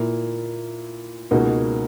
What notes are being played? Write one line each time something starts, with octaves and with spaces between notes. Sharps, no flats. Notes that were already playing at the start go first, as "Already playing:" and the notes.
Already playing: A#2 A#3 E4
C#2 B2 A#3 D#4 F#4